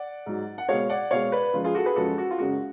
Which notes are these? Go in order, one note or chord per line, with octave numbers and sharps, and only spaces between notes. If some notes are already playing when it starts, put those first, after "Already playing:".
Already playing: D5 F#5
G#2 F#3
F#5
B2 G#3 C#5 F5
D5 F#5
B2 G#3 C#5 F5
B4 D5
F#2 F3 G#3 F4
F4 G#4
F#4 A4
G#4 B4
F#2 F3 G#3 F#4 A4
F#4
F4
F#2 C#3 G#3 F#4